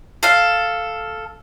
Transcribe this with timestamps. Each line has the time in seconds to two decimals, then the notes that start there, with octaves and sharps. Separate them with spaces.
0.23 A4 F5